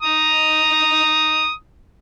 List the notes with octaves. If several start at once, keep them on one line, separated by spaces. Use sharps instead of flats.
A#5 D#6